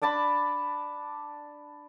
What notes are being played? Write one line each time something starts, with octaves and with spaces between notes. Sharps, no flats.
D4 D5 A5 B5